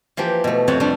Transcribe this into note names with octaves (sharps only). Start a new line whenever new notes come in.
E3 F3 A#3 G4
B2 A3
F2 C3 C4 C#5 F#5 A5
G3 A3 D4 F#5